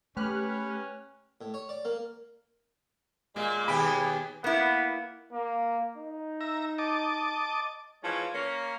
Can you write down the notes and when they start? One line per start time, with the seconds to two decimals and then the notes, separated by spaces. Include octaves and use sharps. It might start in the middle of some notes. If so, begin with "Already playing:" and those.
0.17 A3 C#4 G4 B4 F6 F#6
1.41 A2
1.54 C#5
1.69 D5
1.85 A#3
3.36 A#2 G#3 A#3
3.68 D#2 B2 G4 G#4 B5
4.44 A#3 B3 E4
5.33 A#3
5.97 D#4
6.41 E5 A#5
6.78 D#5 A5 D6
8.03 E3 F3 G#3 C#4 C#5
8.33 A#3 C#4 C#5